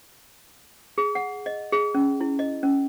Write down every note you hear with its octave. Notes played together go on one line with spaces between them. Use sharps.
G#4
F#5
D#5
G#4
C#4
E4
D#5
C#4